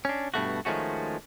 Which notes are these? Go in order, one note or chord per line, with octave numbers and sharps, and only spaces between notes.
C#4 D4
G2 B2 A3 F#4
D#3 F3 G#3 A3 C#4 F#4